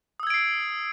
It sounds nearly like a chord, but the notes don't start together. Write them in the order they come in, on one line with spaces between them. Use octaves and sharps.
D#6 E6 G#6 D7 C7